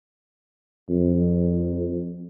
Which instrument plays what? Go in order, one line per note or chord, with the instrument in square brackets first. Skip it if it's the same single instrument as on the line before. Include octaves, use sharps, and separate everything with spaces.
[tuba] F2